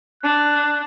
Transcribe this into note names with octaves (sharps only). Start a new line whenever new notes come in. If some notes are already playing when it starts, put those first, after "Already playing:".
D4 F#6